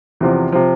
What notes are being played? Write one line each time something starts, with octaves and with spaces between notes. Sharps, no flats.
E2 C3 F3
C3 F3